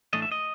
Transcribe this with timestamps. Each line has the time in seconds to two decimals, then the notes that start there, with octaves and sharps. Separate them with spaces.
0.13 A2 E3 A3 D4 D#5
0.22 E5
0.32 D#5